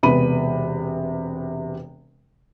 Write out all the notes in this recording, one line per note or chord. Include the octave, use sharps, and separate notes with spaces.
E1 C3 B3 B5 D#7